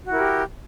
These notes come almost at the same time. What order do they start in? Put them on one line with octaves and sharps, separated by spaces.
F#4 E4 A#4 G4